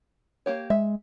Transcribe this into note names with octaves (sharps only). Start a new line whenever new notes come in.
A#3 G4 C#5
G#3 E5